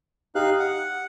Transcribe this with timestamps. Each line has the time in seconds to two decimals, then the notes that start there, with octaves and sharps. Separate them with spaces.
0.35 D#4 G4 F5 F#6
0.60 F#5